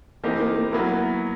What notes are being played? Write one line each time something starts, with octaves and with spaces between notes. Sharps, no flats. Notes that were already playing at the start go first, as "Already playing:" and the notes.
E3 A3 A#3 C4 D#4 G4
A#3
A#3
F#3 A#3 B3 E4